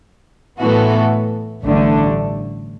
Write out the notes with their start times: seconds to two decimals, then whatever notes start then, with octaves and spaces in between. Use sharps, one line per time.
0.59 A2 E3 B3 F#4 A4
1.63 A1 G2 D3 A3 D4